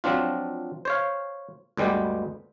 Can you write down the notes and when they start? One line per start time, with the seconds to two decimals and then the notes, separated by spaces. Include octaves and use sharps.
0.04 F3 F#3 C4 D4 F4
0.85 C5 C#5 F5
1.77 D2 G2 G3 G#3 B3 G4